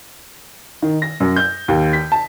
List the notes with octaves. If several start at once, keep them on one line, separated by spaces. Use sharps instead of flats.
D#3
A#6
F#2
G6
D#2
B6
A5